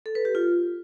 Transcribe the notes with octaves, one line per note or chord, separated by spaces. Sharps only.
A4
B4
G4
F4